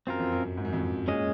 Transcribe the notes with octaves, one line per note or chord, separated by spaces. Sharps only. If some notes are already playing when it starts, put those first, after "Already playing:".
F#2 C4 F4 A#4
F2
F#2
F#2
G#2
F#2
F2
F#2
A#2 G#3 C#4 G#4 D#5